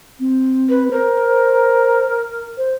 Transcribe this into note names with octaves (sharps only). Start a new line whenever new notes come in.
C4
B4
A#4 C5
C5